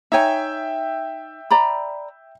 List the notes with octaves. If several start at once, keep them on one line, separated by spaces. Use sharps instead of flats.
D#4 C#5 E5 G5 G#5
D5 A#5 B5